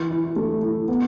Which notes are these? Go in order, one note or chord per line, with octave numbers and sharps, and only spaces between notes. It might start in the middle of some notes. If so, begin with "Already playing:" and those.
Already playing: E3
E4
A3
E4
B3